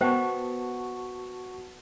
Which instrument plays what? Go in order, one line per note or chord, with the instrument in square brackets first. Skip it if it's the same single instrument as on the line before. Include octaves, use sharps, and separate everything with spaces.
[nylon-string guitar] B3 [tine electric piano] F#4 A5 C#6 [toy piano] A#4 C5 G5